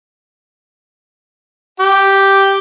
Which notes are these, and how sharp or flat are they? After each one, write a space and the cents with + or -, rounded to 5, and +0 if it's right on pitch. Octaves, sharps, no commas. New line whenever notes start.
G4 -5